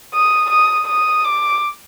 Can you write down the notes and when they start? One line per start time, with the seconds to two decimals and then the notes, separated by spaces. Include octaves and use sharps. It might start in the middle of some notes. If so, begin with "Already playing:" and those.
0.14 D#6
0.50 D#6
0.87 D#6
1.24 D6